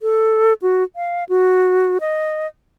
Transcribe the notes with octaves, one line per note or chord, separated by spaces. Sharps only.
A4
F#4
F5
F#4
D#5